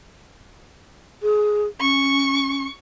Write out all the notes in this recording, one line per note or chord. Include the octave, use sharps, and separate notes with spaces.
G#4
C#4 C#6